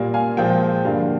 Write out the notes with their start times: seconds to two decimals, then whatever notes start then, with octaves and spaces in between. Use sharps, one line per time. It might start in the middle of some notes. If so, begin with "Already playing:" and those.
Already playing: A#2 G3 A#3
0.14 F5 G#5
0.37 A#2 F3 G#3 G5
0.85 G2 D3 F3 A#3 F5